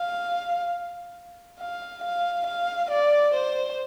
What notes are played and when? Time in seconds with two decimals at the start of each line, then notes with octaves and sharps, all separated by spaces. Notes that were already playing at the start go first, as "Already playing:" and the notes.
Already playing: F5
1.60 F5
2.04 F5
2.46 F5
2.91 D5
3.34 C5